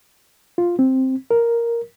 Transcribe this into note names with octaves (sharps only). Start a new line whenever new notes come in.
F4
C4
A#4